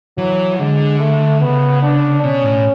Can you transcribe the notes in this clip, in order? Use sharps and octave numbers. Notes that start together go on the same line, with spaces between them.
E3 F#3
D3 G#3
A3
C#3 B3
D4
B2 C#4
A2